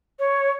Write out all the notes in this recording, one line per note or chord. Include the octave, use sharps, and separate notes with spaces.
C#5